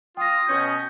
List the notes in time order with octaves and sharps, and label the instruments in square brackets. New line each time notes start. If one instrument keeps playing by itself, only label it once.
[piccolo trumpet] F4 [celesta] G5 A#6 [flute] D#6
[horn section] B2 C#4 [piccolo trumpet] G6